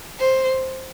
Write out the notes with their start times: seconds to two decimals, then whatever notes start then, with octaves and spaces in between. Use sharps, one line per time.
0.20 C5